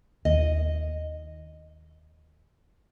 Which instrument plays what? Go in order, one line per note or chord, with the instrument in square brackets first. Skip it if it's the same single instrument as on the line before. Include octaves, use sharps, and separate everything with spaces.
[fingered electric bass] D#2 [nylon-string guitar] D#5